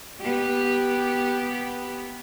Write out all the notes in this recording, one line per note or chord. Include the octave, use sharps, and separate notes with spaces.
B3 G4